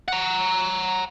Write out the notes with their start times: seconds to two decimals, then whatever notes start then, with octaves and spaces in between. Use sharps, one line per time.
0.08 F#5 A#5